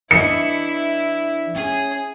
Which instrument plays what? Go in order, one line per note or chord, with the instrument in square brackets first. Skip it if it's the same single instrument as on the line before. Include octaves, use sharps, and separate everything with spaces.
[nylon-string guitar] E3 D4 D#5 [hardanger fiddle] E4 E5 [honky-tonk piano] C#7
[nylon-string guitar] C#4 [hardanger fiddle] G#4